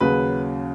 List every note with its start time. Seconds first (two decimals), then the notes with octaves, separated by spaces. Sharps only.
0.01 D#2 C#3 F#3 B4